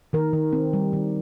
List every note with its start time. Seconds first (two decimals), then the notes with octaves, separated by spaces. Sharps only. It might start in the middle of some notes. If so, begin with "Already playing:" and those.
0.13 D#3 A#4
0.33 D#3
0.53 C4
0.73 G3
0.93 D#3